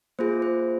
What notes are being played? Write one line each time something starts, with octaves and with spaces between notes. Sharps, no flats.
A#3 F4 G#4 C5
C5